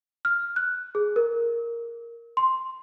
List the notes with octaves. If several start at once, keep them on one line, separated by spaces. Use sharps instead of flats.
F6
F#6
G#4
A#4
C6